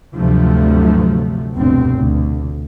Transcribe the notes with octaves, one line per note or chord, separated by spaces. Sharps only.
D2 G2 C3 F3 F#3 A3
F1 D2 G2 B2 C4
D2